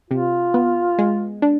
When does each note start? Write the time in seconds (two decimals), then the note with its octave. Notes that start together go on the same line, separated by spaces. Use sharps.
0.10 C3 F4
0.54 B3
0.98 G#3
1.42 D4